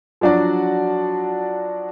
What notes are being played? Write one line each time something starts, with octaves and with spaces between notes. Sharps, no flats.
F3 F#3 D4 F#4 D5